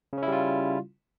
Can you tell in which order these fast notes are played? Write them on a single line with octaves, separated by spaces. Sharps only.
C#3 C#4 E4 G3 F4